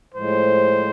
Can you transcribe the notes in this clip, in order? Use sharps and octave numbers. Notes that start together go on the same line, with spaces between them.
A2 F3 G#3 C5